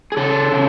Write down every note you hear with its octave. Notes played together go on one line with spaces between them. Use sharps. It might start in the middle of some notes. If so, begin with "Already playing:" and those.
G#4
C#3 A4
C#3